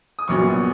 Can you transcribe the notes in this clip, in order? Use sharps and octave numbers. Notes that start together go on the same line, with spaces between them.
D#6
A#1 A#2 F#3 B3 C#6